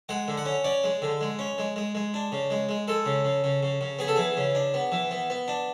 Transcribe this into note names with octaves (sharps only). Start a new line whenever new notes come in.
G#3 F#5
D3
F#5
C#4
C#4 D5
G#3
D3
G#3
C#4
G#3
G#3
G#3
D4
C#3
G#3
G#3
G#3 A4
C#3
C#3
C#3
C#3
C#3
B3 G#4
A4
E3 G#4
C#3
D4
B3
E3
B3
B3
D4